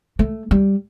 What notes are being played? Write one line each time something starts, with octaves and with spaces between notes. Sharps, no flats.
A3
G3